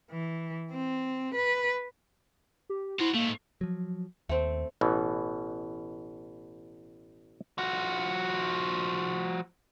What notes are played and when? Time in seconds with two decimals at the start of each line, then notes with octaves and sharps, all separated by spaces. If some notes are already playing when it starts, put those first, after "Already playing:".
0.11 E3
0.73 C4
1.35 B4
2.69 G4
3.00 E4 F#4 C5
3.15 G#2 A3 A#3
3.61 F3 F#3
4.29 D#2 A3 C4
4.81 A1 B2 E3
7.58 F3 F#4